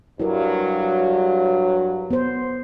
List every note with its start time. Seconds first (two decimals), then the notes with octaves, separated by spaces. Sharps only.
0.20 G2 F#3 E4 A#4
2.11 B3 C5